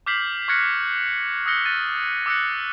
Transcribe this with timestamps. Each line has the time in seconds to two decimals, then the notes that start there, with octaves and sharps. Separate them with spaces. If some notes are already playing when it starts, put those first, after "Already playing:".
0.06 D6 F6 G6 B6 C7 F#7
0.48 C#6 F6 F#6 G#6 A#6 C#7
1.46 D#6 E6 F#6 A#6 C#7 G7
1.65 F6 F#6 A6 D#7
2.26 D6 E6 F#6 A#6 C#7